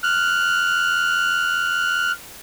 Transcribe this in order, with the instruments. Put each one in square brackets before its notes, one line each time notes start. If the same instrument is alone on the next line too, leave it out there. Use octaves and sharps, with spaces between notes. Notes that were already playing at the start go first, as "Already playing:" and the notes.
[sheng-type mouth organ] F6 F#6